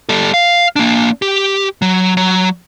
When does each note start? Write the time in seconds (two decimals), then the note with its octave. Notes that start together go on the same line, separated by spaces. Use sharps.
0.09 G3 A4
0.34 F5
0.76 A#3 D4
1.22 G4
1.82 F#3
2.17 F#3